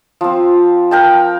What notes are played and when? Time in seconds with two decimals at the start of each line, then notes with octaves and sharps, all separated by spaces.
0.21 F3 C4
0.91 A#4 G5 A5